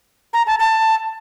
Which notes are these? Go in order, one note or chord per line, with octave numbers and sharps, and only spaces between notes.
A#5
A5
A5